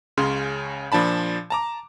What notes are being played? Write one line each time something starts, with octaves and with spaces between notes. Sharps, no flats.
C#2 C#3 C#4 C6
A#2 F3 D4 A5 B5
A5 A#5 D6